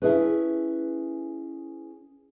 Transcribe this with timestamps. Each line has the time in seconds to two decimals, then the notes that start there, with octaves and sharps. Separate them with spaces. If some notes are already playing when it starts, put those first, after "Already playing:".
0.02 C#4 D4 E4 G#4 A4 B4